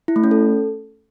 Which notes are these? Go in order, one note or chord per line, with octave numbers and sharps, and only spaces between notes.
E4
A3
C#4
A4